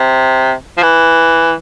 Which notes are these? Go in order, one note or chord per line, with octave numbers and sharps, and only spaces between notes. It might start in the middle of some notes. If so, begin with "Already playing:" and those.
Already playing: C3
F3
E3